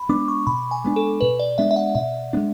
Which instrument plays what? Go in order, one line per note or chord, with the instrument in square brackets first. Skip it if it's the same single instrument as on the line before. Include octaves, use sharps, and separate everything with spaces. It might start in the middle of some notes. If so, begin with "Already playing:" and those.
Already playing: [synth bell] B5
[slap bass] G#3 B3 D4 [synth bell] D6
[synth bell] C#6
[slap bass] B2 [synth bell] B5
[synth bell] G#5
[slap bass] G#3 B3 D4
[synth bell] A4
[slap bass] B2 [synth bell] B4
[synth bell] D5
[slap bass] G#3 B3 D4 [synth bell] E5
[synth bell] E5
F#5
[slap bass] B2 [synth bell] E5
[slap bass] B3 D4
G#3